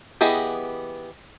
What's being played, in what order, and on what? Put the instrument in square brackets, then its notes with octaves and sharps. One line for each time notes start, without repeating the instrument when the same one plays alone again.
[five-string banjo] E3 B3 G4 G#4 D#5